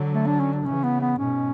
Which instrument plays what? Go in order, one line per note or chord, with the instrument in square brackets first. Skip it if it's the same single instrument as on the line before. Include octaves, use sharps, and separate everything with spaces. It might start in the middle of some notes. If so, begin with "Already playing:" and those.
Already playing: [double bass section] D3 F#3
[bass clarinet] A3
D4
C#4
D4
[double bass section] C#3 E3 [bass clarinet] C#4
[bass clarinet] B3
B3
[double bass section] G#2 B2 [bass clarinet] C#4